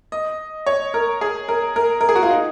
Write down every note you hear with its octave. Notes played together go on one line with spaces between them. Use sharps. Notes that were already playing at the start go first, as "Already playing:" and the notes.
D#5
C#5
A#4
G#4
A#4
A#4
A#4
G#4
F#4
F4
D#4